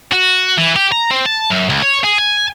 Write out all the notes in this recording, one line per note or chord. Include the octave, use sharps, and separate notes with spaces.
F#4
E3
G4
A#5
C4
A5
F#2
C#2
C#5
G#4
G#5